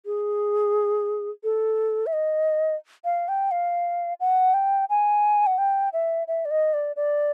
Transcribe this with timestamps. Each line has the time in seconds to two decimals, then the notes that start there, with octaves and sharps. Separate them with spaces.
0.06 G#4
1.44 A4
2.07 E5
2.13 D#5
3.05 F5
3.28 G5
3.51 F5
4.20 F#5
4.54 G5
4.90 G#5
5.47 F#5
5.58 G5
5.93 E5
6.28 E5
6.45 D5
6.51 D#5
6.74 D5
6.96 D5